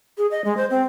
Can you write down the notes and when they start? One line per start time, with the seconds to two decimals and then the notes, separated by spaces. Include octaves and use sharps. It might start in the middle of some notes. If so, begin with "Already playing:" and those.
0.18 G#4
0.31 D#5
0.45 G#3
0.57 C5
0.71 C4